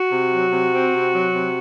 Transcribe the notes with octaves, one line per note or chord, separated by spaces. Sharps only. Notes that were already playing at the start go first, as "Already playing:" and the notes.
Already playing: F#4
C3
F#3
C3
C4
C3
F#3
C3